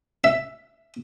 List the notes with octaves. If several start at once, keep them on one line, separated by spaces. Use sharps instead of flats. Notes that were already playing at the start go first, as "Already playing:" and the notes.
E5